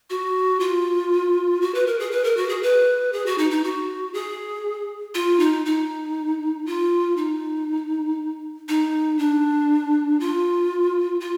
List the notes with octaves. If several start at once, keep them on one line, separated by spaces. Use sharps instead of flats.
F#4
F4
F#4
B4
A#4
G#4
B4
A#4
F#4
G#4
B4
G#4
F#4
D#4
D#4
F#4
G#4
F4
D#4
D#4
F4
D#4
D#4
D4
F4
F4